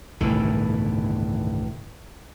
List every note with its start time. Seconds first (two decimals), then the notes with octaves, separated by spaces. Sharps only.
0.21 G1 C2 A2 D#3 E3